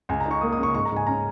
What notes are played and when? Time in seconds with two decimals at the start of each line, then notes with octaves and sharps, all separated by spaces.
0.09 C#2 G#5
0.20 A#5
0.26 D#4
0.31 C#6
0.41 A#3 D#6
0.53 D#6
0.58 C#3
0.63 C#6
0.75 G#2 C#6
0.85 A#5
0.92 G#2 G#5
1.07 C#4 A#5